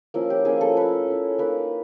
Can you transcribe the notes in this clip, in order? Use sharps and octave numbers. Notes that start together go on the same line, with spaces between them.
F3 A#3 C#4 E4
G4
F3 A#3 C#4 E4 G#4
A4
A3 C#4 E4 B4
A3 C#4 E4
A#3 D#4 B4